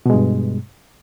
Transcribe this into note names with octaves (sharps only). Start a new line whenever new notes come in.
G2 B2 G#3